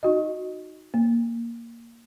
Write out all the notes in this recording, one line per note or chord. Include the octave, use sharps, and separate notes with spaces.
D#4 F#4 D#5
A#3